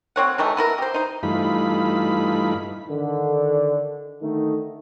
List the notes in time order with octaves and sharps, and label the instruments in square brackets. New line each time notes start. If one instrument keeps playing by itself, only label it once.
[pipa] G3 C4 C#5 F#5
D#3 E3 F#3 A3
B3 E4 A#4
G4 C5
D#4 C5
[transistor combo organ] G2 E3 A3 D#4 F4 B5
[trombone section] D3 D#3
D3 D#3 A3 D#4